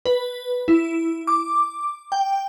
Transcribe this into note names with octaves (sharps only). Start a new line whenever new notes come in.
B4
E4
D6
G5